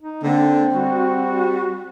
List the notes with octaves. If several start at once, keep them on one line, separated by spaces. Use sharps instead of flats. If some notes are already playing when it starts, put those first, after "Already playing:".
D#4
D3 A#3 C4
G3 F#4